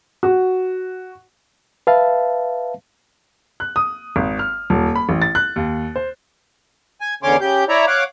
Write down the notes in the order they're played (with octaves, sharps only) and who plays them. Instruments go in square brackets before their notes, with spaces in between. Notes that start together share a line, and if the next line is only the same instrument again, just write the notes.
[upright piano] F#4
[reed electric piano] B4 E5 F5 A5
[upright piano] F#6
D#6
G#1
F6
D#1
B5
A1
A6
F#6
D#2
C5
[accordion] G#5
E2 D3 C#4 C#5 C6 D6
C#3 G4 G6
E4 C#5 D5 E5 A#5
C#5 F5 F#5 D6